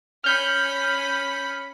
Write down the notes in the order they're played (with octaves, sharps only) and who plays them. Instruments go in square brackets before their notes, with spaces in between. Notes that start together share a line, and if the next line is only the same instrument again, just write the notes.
[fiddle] C#4 B5 [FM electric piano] F6 G6